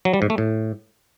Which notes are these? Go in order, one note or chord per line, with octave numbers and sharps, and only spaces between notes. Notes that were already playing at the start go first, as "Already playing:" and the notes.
F#3
G3
G#2
A3
A2